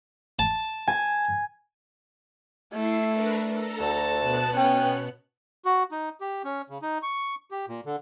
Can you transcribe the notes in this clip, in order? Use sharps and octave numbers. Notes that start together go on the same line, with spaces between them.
A5
G#5
A3 E4 C7
D4 A#4 B4
A4 A#5
D2 A5
B2 B3 F#6
C#4 G5
F#4
D#4
G4
C#4
C#3
D#4
C#6
G4
A#2
D3